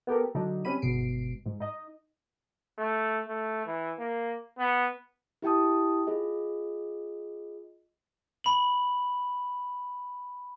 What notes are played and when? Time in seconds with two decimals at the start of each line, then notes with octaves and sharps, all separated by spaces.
0.07 B3 G4 A4 A#4
0.35 D3 F#3 D4 D#4
0.65 G3 C4 C#4 B5 D#7
0.82 G1 G#2 B2 C7 D7
1.46 G#2
1.60 D#4 D#5
2.78 A3
3.27 A3
3.66 E3
3.98 A#3
4.58 B3
5.42 E4 G4 G5 A5 D#6
6.07 F4 G#4 D#5
8.44 B5 F#7